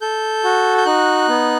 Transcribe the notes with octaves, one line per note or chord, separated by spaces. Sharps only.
A4 G6
F#4
G6
D#4 F#6
B3